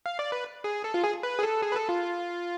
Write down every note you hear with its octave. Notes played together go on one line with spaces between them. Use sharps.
F5
D5
B4
G#4
A4
F4
G#4
B4
G#4
A4
G#4
B4
A4
F4